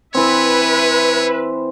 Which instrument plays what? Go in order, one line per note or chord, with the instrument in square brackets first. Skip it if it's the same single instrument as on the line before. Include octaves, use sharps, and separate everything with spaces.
[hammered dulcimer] E3 C4 [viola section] B4 E5 [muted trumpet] C#5